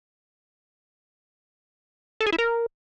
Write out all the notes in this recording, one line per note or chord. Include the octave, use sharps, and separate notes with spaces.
A4
G#4
E4
A#4